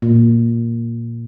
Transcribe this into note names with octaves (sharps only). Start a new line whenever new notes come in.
A#2